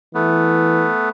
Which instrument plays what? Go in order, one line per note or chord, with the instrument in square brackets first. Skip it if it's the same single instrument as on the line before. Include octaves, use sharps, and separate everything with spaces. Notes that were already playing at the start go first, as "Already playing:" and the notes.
[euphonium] E3 [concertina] A3 B3